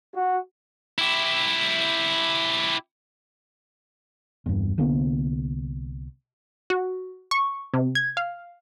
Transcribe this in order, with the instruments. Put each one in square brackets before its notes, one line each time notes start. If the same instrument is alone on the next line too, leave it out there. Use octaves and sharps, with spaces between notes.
[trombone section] F#4
[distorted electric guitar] E4 G4
[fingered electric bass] E1 G2
C2 D3 A#3 B3
[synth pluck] F#4
C#6
C3
G#6
F5